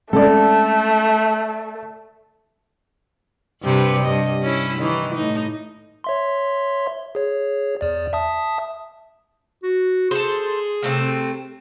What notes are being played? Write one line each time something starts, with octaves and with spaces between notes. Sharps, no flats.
G#3 A3 C4 C#4 A4 D5
G2 C3 B4
G2 D#5
C#4 E4
D#3 E3
A2 D#4
C#5 E5 C6
G#4 C#5
E2 D5
E5 A5 D#6
F#4
G#4 A4 C5
C3 A3 C4